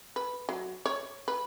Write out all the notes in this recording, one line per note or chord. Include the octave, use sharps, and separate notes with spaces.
B4
F#3
C#5
B4